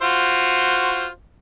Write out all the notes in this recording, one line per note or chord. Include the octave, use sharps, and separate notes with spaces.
F4 F#4 C5